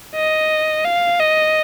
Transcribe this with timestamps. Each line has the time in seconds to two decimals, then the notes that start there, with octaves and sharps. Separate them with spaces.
0.15 D#5
0.85 F5
1.20 D#5